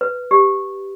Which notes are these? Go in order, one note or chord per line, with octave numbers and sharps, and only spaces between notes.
B4
G4